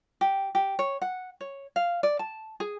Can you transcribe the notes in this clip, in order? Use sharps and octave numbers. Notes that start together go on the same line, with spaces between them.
G4
G4
C#5
F#5
C#5
F5
D5
A5
G#4